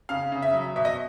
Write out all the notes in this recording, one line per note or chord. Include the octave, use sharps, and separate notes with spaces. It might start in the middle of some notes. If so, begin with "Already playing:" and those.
C#3 F5
C#3
E5
F#3
B2 E5
D#5